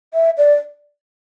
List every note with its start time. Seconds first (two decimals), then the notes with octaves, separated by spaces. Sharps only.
0.14 E5
0.38 D5